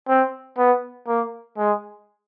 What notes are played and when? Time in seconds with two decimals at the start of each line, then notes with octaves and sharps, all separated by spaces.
0.08 C4
0.58 B3
1.08 A#3
1.58 G#3